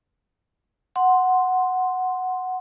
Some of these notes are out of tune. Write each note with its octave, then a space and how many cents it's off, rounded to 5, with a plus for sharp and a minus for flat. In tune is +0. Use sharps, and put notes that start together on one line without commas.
F#5 +0 C6 +0